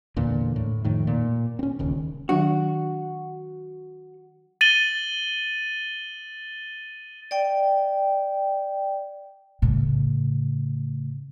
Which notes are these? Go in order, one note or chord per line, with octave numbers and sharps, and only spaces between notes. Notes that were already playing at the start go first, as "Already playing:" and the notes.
E2 A#2 D3
A2
F2 A2 D#3
A#2
C4 C#4
D#1 D#2 C#3
D#3 F#3 D4 F#4
A6 D#7 F#7 G7
D5 G5
A2 C#3